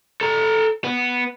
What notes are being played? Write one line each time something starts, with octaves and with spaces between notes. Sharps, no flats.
A4 A#5
B3